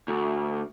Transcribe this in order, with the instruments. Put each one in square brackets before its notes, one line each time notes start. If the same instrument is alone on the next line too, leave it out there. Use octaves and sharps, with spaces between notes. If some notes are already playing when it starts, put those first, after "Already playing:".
[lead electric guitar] D2